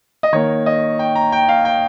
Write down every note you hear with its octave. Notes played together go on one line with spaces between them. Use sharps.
D#5
D#3 A#3 C#5
D#5
G5
A#5
G5
F5
G5